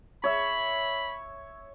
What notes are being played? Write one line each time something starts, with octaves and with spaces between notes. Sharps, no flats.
C#5 E5 B5